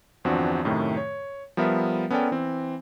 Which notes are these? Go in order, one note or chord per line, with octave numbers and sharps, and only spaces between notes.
G1 E2 F3 C4 D4 F#4
F#2 A2 C3 D#3 A3
C#5
F3 G3 B3 A#4 E5
B3 C#4 A4 A#4 D5 G5
E3 C4